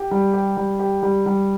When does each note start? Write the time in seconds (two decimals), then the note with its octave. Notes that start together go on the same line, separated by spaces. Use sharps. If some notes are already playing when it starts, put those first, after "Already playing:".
Already playing: G4
0.11 G3
0.33 G4
0.57 G3
0.79 G4
1.03 G3
1.26 G3